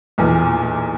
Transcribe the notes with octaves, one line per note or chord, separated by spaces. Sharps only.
B1 E2 A#2